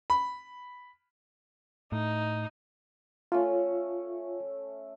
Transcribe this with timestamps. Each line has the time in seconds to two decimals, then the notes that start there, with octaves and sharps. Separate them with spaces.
0.10 B5
1.92 A2 D#4
3.32 A3 C#4 F4